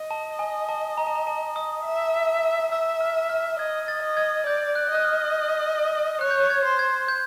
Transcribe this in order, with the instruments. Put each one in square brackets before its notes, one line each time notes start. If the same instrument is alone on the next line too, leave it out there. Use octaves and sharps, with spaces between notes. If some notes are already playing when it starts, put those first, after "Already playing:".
Already playing: [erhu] D#5
[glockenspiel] A5
G#5
A5
A#5
A5
A#5
A5
D#6
[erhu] E5
[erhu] E5 [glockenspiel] E6
[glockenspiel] F6
F6
[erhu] D#5 [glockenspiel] G#6
[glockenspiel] A6
[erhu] D#5
[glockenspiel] G#6
[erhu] D5 [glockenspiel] G6
[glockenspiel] F#6
[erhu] D#5 [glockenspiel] F#6
[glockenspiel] F6
[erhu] C#5 [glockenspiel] F#6
[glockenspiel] G6
F#6
G#6
[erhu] C5
[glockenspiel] G#6
G6